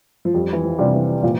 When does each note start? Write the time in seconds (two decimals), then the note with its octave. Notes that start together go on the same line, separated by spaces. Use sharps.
0.25 F3
0.34 F2 G3
0.53 E3
0.64 F3
0.78 C3 G3 D4 F4
0.94 E3
1.23 A#2 F3